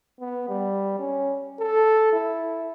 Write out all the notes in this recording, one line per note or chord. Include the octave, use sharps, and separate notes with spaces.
B3
G3
C#4
A4
E4